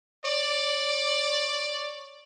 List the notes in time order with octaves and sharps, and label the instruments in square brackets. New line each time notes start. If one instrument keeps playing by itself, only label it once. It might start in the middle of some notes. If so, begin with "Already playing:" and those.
[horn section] C#5 D5